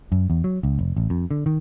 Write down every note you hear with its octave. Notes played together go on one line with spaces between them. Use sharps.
F#2
E2
F#3
C#2
F1
A1
F2
D3
D#3